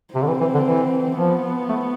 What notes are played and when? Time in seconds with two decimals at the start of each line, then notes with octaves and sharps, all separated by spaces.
0.15 C3 C4
0.23 D3
0.28 E3
0.41 E3
0.54 D3
0.67 E3
1.18 F3 B3
1.69 A3